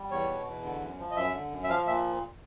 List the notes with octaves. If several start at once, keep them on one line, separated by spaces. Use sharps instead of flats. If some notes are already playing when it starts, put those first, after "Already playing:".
Already playing: G3
E2 C#5
B2
E2
D3
F#2
F3
D#5
F#2 E5
D3
F#2
E5
F3 F5
A#2 E5